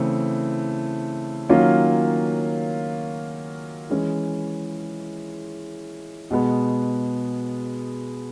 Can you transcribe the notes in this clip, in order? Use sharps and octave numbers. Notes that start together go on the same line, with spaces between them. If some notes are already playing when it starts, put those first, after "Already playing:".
Already playing: C#3 E3 A3 C4
D#3 F#3 A#3 C#4 F4
E3 G#3 C#4
B2 G#3 B3